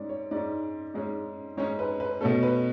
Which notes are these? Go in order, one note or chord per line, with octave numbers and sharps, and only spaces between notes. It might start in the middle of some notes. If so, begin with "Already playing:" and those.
Already playing: G#2 G#3 C#4 D5
C#5
G#2 G#3 C#4 D5
G#2 G#3 C#4
G#2 G#3 C#4 C#5
B4
B4
B2 A3 C#4 A4
B4